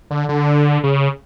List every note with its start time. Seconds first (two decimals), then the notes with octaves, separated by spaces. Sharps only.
0.11 D3
0.29 D3
0.84 C#3